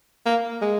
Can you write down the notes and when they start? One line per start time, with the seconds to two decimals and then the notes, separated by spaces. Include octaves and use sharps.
0.26 A#3
0.62 G#3